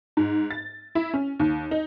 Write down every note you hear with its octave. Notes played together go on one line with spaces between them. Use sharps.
G#2
A6
E4
C#4
D#2
D#4